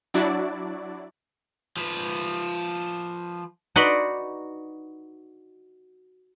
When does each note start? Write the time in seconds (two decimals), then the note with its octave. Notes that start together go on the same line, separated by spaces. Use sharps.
0.14 F#3 D4 E4 F#4 D5
1.77 F3 B4
3.76 D#4 F#4 B4 D5 B5 C6